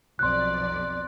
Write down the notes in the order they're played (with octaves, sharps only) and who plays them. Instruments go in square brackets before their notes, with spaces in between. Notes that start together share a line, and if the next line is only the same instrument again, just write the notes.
[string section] B1 F2 D5 [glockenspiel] C6 F#6